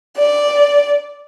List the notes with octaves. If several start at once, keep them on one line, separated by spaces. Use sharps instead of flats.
D5